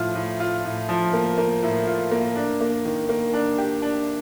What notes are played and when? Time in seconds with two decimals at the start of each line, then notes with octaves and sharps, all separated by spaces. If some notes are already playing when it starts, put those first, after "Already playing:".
Already playing: A2 F3 F4
0.15 A2
0.40 F4
0.65 A2
0.89 F3
1.13 A#3
1.38 A#3
1.63 A2
1.87 F4
2.11 A#3
2.36 D4
2.61 A#3
2.85 D#3
3.09 A#3
3.33 D4
3.58 G4
3.82 D4